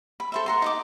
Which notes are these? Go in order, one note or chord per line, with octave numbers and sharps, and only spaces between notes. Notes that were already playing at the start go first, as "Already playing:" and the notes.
B5
A4 C5 E5
F#5 A#5 C6
D#4 D#5 D6